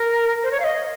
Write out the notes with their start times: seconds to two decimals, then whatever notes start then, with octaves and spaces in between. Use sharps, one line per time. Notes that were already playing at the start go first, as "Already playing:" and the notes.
Already playing: A#4
0.43 C5
0.51 C#5
0.60 F5
0.64 D#5